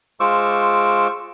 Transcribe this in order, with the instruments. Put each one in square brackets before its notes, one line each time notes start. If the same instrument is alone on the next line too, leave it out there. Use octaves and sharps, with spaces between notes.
[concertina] G#3 F4 C5 C#6 D6 E6